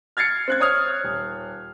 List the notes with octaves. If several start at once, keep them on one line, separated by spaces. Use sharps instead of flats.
F6 G#6 A6 C7 C#7
C4 F#6 G#6
C#5 D#6 F6
D#1